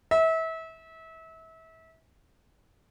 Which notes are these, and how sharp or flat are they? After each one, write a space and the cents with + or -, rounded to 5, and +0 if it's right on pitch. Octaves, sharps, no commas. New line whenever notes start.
E5 -30